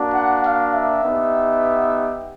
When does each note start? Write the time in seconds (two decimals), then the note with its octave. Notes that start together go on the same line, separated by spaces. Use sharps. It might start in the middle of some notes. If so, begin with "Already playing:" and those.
Already playing: A#3 D4 F#4
0.13 F#5
0.43 F5
0.72 E5
1.02 B3 D#4 G4